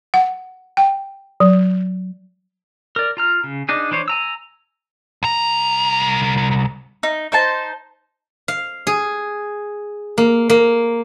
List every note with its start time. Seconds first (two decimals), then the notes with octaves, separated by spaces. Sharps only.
0.14 F#5
0.77 G5
1.40 F#3
2.96 A#4 D5
3.17 F4 A#5 F6
3.44 C#3
3.69 D4 D#4 G#4
3.91 E3 D4 C5 C#5
4.08 G#5 A#5 E6
5.23 C2 A#5
7.03 D#4
7.32 D#4 C5 A5
8.48 F5
8.87 G#4
10.18 A#3
10.50 A#3